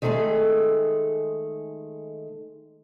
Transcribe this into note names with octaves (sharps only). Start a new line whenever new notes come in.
D#3 G#3 A3 C#4 G#4 A4